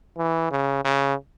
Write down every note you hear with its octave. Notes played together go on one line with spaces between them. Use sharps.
E3
C#3
C#3